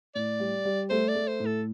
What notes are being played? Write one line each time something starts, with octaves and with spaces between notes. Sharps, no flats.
A2 D5
G3
G3
A3 C5
D5
A3
C5
A2
A4